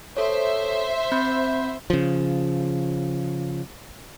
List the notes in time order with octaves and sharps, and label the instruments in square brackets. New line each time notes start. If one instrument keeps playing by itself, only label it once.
[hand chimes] A4 C#5 [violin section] C5 E5
[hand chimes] C4 B5 G6
[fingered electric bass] C#3 F3